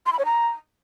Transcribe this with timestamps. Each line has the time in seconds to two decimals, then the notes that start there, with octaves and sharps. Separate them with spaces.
0.06 C6
0.13 B5
0.19 C#5
0.25 A#5